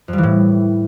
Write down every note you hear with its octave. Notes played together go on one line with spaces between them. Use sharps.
F2
G3
E3
A2